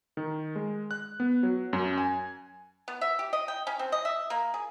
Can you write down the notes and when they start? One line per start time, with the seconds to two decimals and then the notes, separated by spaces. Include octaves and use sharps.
0.17 D#3
0.56 G#3
0.91 F#6
1.20 B3
1.43 F#3
1.73 F#2
1.98 G#5
2.88 B3
3.01 E5
3.19 G4
3.33 D#5
3.48 G5
3.67 C#4
3.79 C4
3.92 D#5
4.05 E5
4.30 A#3
4.54 G#4